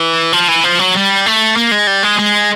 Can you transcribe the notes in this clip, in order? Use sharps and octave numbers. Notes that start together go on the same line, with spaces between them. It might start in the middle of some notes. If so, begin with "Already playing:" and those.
Already playing: E3
F3
E3
F3
F#3
G3
A3
A#3
G#3
G3
G#3
G#3